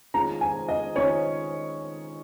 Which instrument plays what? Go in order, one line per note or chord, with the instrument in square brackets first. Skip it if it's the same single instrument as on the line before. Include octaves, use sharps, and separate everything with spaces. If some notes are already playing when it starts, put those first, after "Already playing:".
[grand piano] D#3 G#3 C#4 F4 [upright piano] A#5
[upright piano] G#5
D#5
[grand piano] D#3 G#3 C#4 F4 [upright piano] C#5